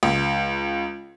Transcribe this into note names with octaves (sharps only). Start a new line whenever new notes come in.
C#2